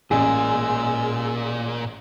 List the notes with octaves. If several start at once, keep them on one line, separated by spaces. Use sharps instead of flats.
A1 A#2 G#3 G#4 E6